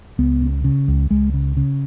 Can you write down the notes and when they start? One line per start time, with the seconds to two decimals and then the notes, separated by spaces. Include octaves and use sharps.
0.18 C#2 B3
0.42 C#3
0.64 C#3
0.88 C#2
1.11 C#2 G#3
1.34 C#3
1.57 C#3